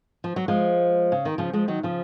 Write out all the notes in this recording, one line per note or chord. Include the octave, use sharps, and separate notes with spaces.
F3
F#3
F3 G#3
C#3
D#3
C#3 F3
F3 G#3
D#3 F#3
C#3 F3